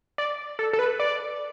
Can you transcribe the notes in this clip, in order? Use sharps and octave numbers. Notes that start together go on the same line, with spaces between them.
D5
A4
A4
B4
D5